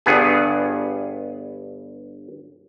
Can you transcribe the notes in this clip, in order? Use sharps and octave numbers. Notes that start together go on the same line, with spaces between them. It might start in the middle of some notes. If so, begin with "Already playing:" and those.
G1 G2 B3 G#4